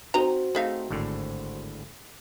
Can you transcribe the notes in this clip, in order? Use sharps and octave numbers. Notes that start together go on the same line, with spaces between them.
C4 D#4 F#4 C5 A#5
A3 C4 D#4 G#4 E5 F5
G#1 A2 D3